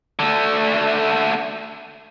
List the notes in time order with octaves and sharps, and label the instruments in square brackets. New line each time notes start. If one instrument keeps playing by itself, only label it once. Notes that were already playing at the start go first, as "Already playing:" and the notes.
[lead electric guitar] D3 A3